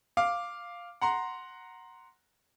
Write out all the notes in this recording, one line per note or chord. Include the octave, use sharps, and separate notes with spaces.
F5 D6
F#5 A#5 C6